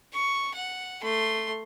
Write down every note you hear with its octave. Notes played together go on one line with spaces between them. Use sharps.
C#6
F#5
A3 C6